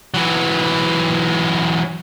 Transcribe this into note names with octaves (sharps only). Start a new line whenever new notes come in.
E3 F#3